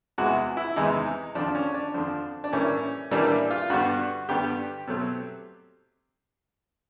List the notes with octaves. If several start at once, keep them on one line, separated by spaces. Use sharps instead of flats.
E2 C3 E3 G#3 F#4
E4
E2 C3 E3 G#3 D#4
F2 D3 F3 D4
C#4
D4
F2 D3 F3
D4
A2 E3 G3 A#3 C#4
A2 E3 G3 A#3 D4
F4
G2 D3 G3 B3 F#4
G2 D3 G3 B3 G4
B2 F#3 A3 C4